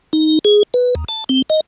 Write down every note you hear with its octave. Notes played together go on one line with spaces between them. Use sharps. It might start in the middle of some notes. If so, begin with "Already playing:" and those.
D#4
G#4
B4
D#2
A5
C4
D#5